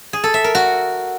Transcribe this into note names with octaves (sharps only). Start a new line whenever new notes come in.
G#4
A4
E5
A#4
F#4